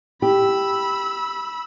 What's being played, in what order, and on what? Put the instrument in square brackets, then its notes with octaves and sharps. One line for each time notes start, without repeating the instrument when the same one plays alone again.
[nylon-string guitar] G4 [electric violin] B5 E6